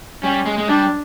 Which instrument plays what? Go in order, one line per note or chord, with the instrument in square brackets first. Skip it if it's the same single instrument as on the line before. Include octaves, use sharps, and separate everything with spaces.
[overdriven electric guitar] G3 [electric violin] C#4
[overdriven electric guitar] G#3
G#3
[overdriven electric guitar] G3 [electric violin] D4